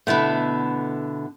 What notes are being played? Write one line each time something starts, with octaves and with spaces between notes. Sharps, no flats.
B2 D3 A3 B3 E4